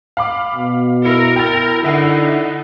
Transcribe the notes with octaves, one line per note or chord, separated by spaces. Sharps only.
F5 B5 D6
B2
E4 A#4 C#7
E4 G5 A6
D3 D4 D#4 E5 F#5 C7